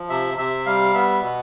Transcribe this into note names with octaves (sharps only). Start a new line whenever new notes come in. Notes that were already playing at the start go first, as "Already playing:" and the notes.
Already playing: F3
C3 E5
C3 E5
G3 F5
B3 E5
B2